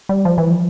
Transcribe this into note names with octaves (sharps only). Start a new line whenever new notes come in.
G3
F3
E3
F3